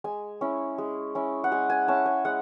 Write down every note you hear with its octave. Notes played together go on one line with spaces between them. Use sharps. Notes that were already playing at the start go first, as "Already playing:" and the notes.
G#3 G#5
C#4 E4
G#3
C#4 E4
F#5
G#3 G#5
G#5
C#4 E4 A5
G#5
G#3 F#5